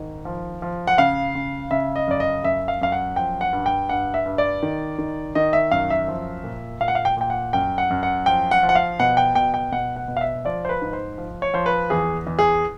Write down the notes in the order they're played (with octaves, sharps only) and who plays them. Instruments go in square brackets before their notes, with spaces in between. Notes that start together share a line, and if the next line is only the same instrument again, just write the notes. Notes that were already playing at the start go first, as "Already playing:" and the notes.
Already playing: [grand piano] G#2 D#3
F3
F3
F#5
C#3 F5
C#3
C#3 E5
D#5
F#2 D5
D#5
F#2 E5
F5
F#2 F5
F#5
F3 G5
F#5
G2
G5
G2 F#5
E5
G2
D5
D#3
D#3
D#3 D#5
E5
F#2 F5
E5
F3
A#2
A#2 F5
F#5
F5
G5
A#2 G5
F#5
F#2 G5
F#5
F#2
F#5
F3 G5
F#5
F3
F#5
F5
B2 F#5
G5
B2 G5
G5
B2 F#5
F#5
B2
F5
E5
F3 D5
C5
B4
G#2
C5
F3
C#5
F3 C5
B4
E2 G#4
E2
G#4